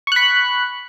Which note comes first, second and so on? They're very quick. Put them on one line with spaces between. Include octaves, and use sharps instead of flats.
C#6 F#6 B5